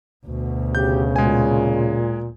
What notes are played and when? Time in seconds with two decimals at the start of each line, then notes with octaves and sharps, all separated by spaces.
0.26 D2 B2
0.75 C#3 G4 G6
1.16 A#2 G#3 G#5